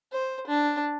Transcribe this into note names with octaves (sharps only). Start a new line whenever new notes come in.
C5
D4